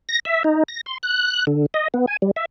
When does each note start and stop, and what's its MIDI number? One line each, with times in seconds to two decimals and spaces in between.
0.09 0.20 94
0.25 0.43 76
0.44 0.63 63
0.68 0.81 94
0.86 0.98 84
1.03 1.45 90
1.47 1.66 50
1.74 1.88 75
1.94 2.06 59
2.07 2.17 80
2.22 2.31 55
2.36 2.45 76